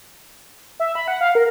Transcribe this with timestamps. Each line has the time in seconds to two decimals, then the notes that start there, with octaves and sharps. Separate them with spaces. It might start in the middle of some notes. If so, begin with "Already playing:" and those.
0.80 E5
0.95 B5
1.08 F#5
1.21 F5
1.35 A#4